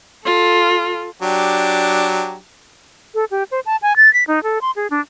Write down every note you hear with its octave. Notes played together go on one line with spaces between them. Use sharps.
F4 A4
F#3 D4 G4
A4
G4
C5
A5
G#5
A6
B6
D#4
A4
C6
G#4
D4